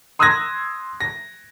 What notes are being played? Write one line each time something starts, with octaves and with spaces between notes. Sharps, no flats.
C6 D#6 E6 F#6 G#6 A#6
A#6